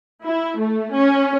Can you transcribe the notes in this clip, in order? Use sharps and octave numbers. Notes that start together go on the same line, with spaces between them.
E4
A3
C#4